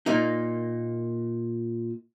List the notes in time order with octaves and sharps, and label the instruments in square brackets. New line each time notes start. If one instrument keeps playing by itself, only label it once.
[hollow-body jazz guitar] A#2 A#3 D#4